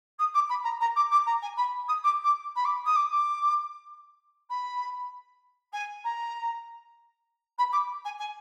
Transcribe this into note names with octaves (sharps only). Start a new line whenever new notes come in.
D#6
D6
B5
A#5
A#5
D6
D6
A#5
G#5
B5
D#6
D6
D6
B5
D6
D#6
D6
D6
B5
G#5
A#5
B5
D6
G#5
G#5